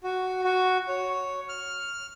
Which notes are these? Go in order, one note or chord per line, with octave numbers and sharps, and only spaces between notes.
F#4
F#4
C#5
F6